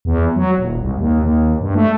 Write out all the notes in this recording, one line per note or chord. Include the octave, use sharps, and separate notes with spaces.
E2
F#3
D#1
C2
D#2
D#2
G2
A3